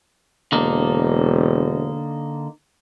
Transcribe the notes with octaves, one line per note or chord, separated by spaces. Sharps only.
E1 D3 A#3 D#4